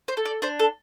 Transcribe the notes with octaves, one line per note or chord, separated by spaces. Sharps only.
C5
A4
D5
D4 C5
A4